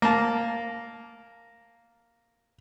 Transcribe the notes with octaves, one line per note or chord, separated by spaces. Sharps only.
A#3 A5